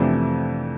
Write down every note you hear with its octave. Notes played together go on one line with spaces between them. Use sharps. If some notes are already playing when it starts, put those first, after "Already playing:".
Already playing: F2 C3 E3 A3 D4